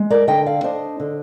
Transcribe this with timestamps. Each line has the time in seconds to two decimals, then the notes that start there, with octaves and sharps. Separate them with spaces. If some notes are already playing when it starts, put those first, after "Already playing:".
Already playing: G#3
0.10 A#4 D5
0.28 D3 D#5 G5
0.46 D5 F5
0.63 D4 C5 D#5
1.00 D3